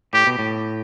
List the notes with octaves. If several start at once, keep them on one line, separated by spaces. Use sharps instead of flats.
A2 G4
B2
A2